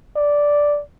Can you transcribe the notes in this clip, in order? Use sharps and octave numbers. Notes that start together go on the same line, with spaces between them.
D5